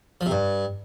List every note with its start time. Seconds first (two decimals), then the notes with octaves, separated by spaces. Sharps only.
0.21 F3
0.26 C3
0.31 G2